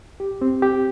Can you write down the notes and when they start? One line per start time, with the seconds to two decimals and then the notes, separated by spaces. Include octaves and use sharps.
0.20 G4
0.42 C4
0.62 G4